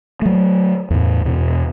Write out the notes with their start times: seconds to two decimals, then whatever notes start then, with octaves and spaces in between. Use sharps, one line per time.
0.22 F#3 A3
0.90 E2 A2
1.25 E2 B2